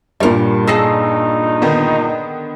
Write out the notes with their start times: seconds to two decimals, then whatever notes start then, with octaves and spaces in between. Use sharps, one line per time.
0.20 G2 A#2 G3 A#4
0.67 D#4 G#4 A4 E6 A#6 C7
1.62 D3 D#3 B3